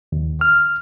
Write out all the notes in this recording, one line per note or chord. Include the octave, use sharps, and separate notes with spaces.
D#2
F6